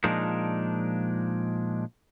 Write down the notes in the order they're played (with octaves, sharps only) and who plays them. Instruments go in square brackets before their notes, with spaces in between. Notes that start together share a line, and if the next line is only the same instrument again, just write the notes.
[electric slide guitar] A#2 F3 G#3 D4 D#4 A#4